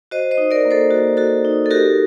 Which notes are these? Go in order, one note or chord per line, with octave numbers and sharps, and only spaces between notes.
F#4 C5 D#5
C5 D#5
D#4
A#4 D5
A#3
A4 C5
A#3 F#4
F#4 A4
D#4
A4
F#4 G4 A#4